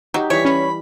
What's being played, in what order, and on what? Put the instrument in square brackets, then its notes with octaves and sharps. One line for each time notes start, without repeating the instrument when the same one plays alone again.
[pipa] F#3 [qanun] D#4 G4
[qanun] E3 G3 [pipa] C#5 [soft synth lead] B6
[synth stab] C#4 [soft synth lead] B5